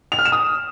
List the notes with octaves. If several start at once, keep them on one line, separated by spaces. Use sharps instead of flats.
F7
F6
E7
D#6